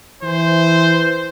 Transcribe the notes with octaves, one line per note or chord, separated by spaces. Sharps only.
E3 C5